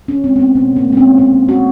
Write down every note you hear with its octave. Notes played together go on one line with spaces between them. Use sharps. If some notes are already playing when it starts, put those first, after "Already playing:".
C#4
G#3 C4
B3
C4
B2 B3
A#3
G#3
C#4
C4
A#2 C4
F#3 A3 F#4